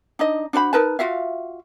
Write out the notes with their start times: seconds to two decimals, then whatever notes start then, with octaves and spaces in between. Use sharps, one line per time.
0.19 D4 D#4 D#5
0.53 D4 F#4 C5 B5
0.73 D#4 A#4 B4 A5
0.99 F4 F#4 E5 F5